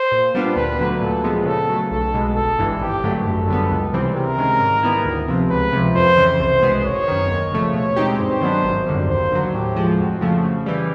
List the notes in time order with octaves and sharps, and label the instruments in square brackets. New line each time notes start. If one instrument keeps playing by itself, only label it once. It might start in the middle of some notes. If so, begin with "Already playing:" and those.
Already playing: [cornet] C5
[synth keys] A#2
G3 B3 D4 F4
[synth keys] D2 [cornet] B4
[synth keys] D3 F#3 A3
[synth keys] A#2 [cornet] A4
[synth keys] F3 G#3 B3
[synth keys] C#3 [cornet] A4
[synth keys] F#3 A3
[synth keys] B1 [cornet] A4
[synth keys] B2 G#3
[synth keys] G1 [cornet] A4
[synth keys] G2 E3 G#3
[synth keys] G#1 [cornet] G4
[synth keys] G2 D3 F#3 A3
[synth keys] F#2 [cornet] A4
[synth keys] D3 G3 B3
C#2
C3 E3 G3 C4
[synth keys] C3 [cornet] A#4
[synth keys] D#3 G#3 C#4
G#2
D#3 G3 B3 E4
D2
C3 F3
[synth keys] C#2 [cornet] B4
[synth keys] C3 F3
[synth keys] F2 [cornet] C5
[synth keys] C#3 E3
[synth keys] C2 [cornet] C5
[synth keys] B2 G#3 B3
[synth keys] G#1 [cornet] C#5
[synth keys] F#2 D#3
D#2
C#3 F3 A3
[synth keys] B2 [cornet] C#5
[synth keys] G#3 C4 D#4 G4
[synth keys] G2 [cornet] C5
[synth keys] D#3 F#3 B3 D4
G#1
F#2 D3 G3
[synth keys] D#2 [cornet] C5
[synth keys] D3 F#3
[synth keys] A2 [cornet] G4
[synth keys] F3 G#3
[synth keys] F2 [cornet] F#4
[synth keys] C#3 F3 A3
C#3
E3 G3